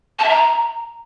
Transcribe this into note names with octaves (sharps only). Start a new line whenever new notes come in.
A5
E5
A#5